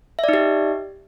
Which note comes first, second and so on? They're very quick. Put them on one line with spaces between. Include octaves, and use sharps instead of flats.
E5 D5 D#4 G4